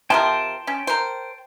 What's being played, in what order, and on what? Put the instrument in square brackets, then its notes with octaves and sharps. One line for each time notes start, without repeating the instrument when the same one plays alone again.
[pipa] C3 F3 A#4 [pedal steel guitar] G5 A5 C6
[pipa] C#4
A#4 C5